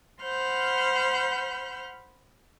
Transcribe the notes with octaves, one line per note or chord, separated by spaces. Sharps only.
C5 F#5 B5 F6 G6